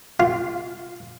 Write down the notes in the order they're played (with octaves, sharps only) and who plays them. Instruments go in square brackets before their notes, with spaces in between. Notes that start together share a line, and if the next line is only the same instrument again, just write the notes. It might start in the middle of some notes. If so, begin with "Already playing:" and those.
[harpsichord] F4